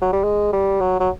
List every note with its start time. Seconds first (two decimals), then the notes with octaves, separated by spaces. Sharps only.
0.01 F#3
0.13 G3
0.24 G#3
0.53 G3
0.81 F#3
1.00 F#3